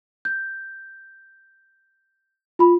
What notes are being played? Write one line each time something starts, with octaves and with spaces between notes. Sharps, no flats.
G6
F4 B5